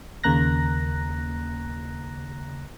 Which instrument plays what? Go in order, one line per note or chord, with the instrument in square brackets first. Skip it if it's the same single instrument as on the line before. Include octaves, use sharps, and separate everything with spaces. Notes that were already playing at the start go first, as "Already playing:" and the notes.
[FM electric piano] D#2 C#3 A#3 A#5 F#6 A#6